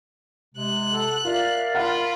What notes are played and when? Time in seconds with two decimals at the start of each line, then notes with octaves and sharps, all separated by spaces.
0.55 C3 G#3 F#6
0.89 A4 F#5
1.25 F4 A#4 D5 E5 F5
1.75 F4 F#5 B5 F6